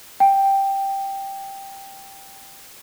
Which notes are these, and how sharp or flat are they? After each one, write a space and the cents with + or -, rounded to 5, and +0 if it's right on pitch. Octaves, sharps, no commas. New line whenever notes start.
G5 +0